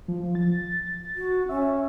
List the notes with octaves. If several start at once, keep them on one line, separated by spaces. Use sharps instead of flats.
F3
A6
F#4
C#4 E5